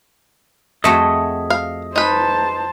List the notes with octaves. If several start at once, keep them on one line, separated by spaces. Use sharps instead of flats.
F2 A3 F#4 G#4 D#5 E5
F5
D#4 B4 C5 A5